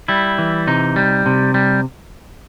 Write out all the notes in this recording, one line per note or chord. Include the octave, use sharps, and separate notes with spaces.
G3 E4
E3
C3 D#4
G3
C3
G3